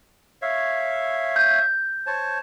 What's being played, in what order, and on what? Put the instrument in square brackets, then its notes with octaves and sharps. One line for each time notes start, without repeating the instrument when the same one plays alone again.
[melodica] C#5 E5 F5
[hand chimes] G6
[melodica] C5 C#5 A5